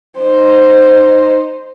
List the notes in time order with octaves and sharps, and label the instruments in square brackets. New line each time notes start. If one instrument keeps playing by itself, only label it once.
[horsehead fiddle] D#4 C5